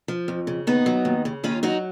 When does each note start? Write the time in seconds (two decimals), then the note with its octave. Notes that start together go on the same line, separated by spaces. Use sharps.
0.08 F3
0.28 F2
0.47 C#3
0.67 D#2 B3 D#4
0.86 F#3
1.05 D#2
1.25 C#3
1.44 D#2 C#4 F4
1.63 F#3 D#4 F#4